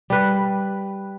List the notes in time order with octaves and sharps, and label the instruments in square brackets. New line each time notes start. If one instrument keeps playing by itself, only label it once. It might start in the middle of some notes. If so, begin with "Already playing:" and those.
[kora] G3 B4